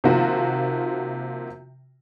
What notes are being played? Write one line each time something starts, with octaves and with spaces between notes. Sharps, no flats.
C3 D#3 F3 A#3 F4 F#4